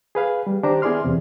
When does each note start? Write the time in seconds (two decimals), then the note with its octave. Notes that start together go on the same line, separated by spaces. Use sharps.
0.15 G#4 B4 F5
0.47 G3
0.63 D#3 D4 G4 C5 A#5
0.82 B3 E4 G#4 D5 C6 F6
1.04 E2 C3